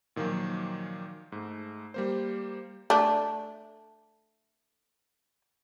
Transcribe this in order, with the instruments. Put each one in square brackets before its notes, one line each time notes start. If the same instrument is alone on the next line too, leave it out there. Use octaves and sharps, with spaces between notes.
[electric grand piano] A#2 D#3 F3 F#3 A#3
G#2 A3
G3 A#3 C5
[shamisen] A3 D4